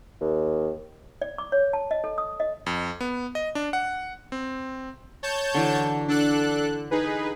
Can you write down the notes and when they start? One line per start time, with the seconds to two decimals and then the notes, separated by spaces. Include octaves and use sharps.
0.21 D#2
1.22 D5
1.38 D6
1.52 C#5
1.73 A5
1.91 D#5
2.04 A4
2.18 D#6
2.40 D#5
2.66 F2
3.01 B3
3.35 D#5
3.55 D4
3.73 F#5
4.32 C4
5.23 C#5 A5 G6
5.55 D3 E3 F#3
6.08 D4 A4 F#6
6.91 D#4 G#4 B4